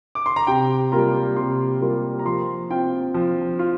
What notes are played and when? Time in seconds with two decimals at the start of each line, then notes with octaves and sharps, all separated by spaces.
0.15 D6
0.26 C6
0.36 A#5
0.47 C3 G5
0.92 G3 A#3 F4 A#5
1.36 C3 C6
1.81 G3 A#3 F4
2.19 A#5
2.25 F3 C6
2.70 C4 F4 G5
3.14 F3
3.59 F4